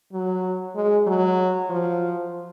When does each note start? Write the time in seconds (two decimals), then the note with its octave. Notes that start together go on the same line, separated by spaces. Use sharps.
0.12 F#3
0.75 G#3
1.07 F#3
1.70 F3